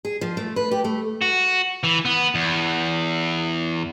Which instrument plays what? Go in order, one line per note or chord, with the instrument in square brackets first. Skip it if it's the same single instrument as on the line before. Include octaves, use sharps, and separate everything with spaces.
[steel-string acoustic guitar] G#4
F3
A3
B4
G4
A3
[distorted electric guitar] F#4
E3
B3
E2